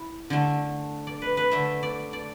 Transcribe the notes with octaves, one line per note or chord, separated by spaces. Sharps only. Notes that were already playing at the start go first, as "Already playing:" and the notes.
Already playing: E4
D3 A3
D5
B4
B4
D3 A3 E5
D5
D5